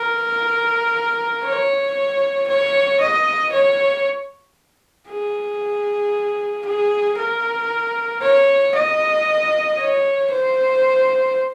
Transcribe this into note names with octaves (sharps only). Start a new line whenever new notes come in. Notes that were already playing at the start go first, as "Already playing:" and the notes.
Already playing: A#4
C#5
C#5
D#5
C#5
G#4
G#4
A#4
C#5
D#5
C#5
C5